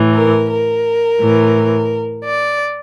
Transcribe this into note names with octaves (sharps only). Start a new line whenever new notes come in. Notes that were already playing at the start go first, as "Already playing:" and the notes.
Already playing: A2 E3
A#4
A#4
A2 E3
D5